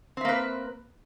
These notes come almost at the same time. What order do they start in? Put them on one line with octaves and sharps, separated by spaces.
C4 E5 A#3 B4